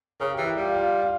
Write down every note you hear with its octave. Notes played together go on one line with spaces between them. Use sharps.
C#3 A#4
G4
E3
G4
G3 F4
F4
F4